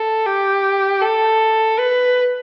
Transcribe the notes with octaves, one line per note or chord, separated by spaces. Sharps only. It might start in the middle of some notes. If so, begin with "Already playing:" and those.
Already playing: A4
G4
A4
B4